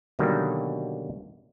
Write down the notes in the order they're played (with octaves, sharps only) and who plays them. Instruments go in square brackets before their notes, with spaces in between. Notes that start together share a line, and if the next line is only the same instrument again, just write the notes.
[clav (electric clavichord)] B2 D3 D#3 F#3 G3 A#3